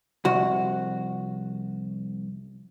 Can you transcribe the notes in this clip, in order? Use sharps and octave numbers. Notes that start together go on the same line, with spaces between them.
C2 F2 F#4